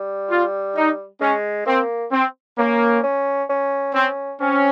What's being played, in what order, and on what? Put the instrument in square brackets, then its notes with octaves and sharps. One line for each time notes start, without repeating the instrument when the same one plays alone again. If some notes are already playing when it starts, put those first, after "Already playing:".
Already playing: [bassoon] G3
[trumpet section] F4
D#4
[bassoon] G#3 [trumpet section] C#4
[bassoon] A#3 [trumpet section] C4
[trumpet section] C4
[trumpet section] A#3 [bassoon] C#4
[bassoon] C#4
C#4
[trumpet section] C4 [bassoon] C#4
[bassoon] C4 [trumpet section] C#4